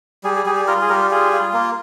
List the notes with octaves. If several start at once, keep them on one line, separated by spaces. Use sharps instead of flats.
G3 G#4
G#4
G3 G#4
G#4
F4 A#4
G#4
G3 A#4
F4 G#4
F4
A#3